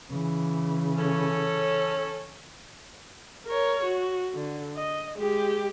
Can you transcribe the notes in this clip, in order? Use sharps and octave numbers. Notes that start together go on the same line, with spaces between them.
C#3 E3
C#4 A4
A#4 C#5
F#4
D3
D#5
G#3 G4